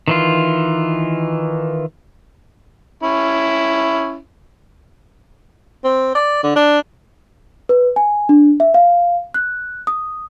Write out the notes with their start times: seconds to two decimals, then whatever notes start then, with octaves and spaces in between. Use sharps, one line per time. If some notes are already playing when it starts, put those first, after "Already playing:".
0.08 D#3 E3 F4
3.03 C#4 E4
5.84 C4
6.15 D5
6.43 D3
6.56 D4
7.69 B4
7.96 G#5
8.29 D4
8.60 E5
8.74 F5
9.34 F#6
9.87 D#6